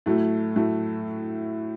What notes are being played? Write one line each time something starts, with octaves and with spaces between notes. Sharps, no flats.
A2 F#3 A3
A2 F#3 A3